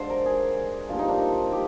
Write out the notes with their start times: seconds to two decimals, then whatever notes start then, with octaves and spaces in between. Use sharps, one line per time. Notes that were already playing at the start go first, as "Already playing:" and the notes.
Already playing: D3 G#3 C5 D5 F5
0.09 A#4
0.26 G#4
0.89 G2 F3 A#3 F4
0.99 D#4
1.08 D4
1.18 D#4
1.52 G4